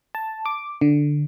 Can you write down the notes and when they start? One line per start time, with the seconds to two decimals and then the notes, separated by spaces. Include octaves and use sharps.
0.15 A5
0.46 D6
0.81 D3